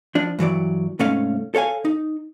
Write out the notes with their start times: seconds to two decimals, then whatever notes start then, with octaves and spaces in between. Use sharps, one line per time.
0.15 F3 D4
0.39 G2 E3 F#3 D5
0.99 C2 G#2 A3 C#4 F5
1.55 A4 C#5 F5 G#5
1.85 D#4